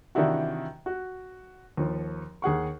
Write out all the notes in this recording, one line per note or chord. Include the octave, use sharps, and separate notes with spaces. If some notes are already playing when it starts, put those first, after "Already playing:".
C3 D#3 E3 D4 E4 F#4
F#4
D#2 F3
D#2 G#4 F#5 C#6